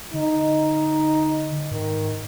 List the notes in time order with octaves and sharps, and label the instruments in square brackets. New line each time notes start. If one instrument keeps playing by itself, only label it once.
[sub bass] D3 [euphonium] D#4
[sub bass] G#2 [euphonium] D#3